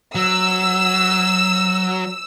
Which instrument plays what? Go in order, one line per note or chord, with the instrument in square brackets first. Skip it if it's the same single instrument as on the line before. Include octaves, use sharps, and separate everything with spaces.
[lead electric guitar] F#3 [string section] E6